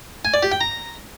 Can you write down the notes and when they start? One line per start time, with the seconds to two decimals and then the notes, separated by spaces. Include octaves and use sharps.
0.25 G#5
0.34 D5
0.43 G4
0.52 G5
0.61 A#5